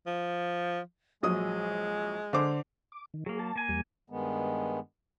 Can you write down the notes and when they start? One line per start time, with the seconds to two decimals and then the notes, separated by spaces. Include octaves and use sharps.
0.07 F3
1.23 A#1 F#3 G#3 D#6
2.33 D3 C5 D6
2.92 D6
3.14 D#3
3.26 F#3 A#3 G#4
3.39 A5
3.56 A#3 G#5
3.69 E2 G3
4.10 G2 D#3 G#3 B3